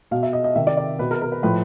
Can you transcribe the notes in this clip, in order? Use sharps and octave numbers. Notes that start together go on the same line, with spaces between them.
B2 F5
E5
D#5
D#5
C3 D#3 E5
D5
D5
B2 B4
A#4
A#4
B4
A2 F3 B4